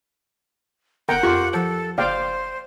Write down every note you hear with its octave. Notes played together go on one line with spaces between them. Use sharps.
G1 A#4 F#5 G5 A#5
F2 F4 G4 C#6
F3 A4
F#1 C5 D5 F5 G5